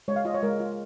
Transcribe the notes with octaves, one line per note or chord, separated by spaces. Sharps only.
G#3 C#5
F5
F4 D#5
C#5
G#3 A#4
F4